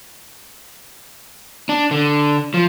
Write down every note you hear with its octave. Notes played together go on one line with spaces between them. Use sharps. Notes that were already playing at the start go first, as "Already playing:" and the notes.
D4
D3
F3